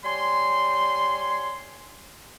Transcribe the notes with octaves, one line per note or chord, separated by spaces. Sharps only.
G3 C#5 G#5 C6